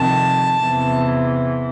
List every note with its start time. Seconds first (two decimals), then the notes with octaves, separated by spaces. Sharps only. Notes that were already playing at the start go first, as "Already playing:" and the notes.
Already playing: F2 C3 D#3 A5
0.60 E2 C3 E3